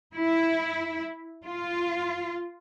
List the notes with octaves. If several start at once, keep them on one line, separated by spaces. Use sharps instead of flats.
E4
F4